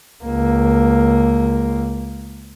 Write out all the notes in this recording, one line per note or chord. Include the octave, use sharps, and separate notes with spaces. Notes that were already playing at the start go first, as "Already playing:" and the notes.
C#2 A#3